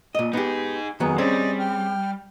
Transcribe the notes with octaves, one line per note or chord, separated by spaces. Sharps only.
A#2 D#5
B3 D#4 G4 G#4
F2 D#3 F#3 B3 G#4
G3 C4 C#4 G#4 D5 D#5
G5 F6